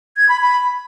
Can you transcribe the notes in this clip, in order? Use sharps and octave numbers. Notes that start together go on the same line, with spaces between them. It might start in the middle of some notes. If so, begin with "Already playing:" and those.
G#6
B5
B5